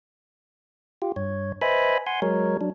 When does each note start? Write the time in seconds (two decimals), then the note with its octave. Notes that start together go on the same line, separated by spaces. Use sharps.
1.02 F4 G4
1.16 G2 C#5
1.61 B4 C5 D#5 E5 G#5 B5
2.07 F#5 G#5 C6
2.22 F#3 G#3 A#4 C#5
2.61 F#3 D4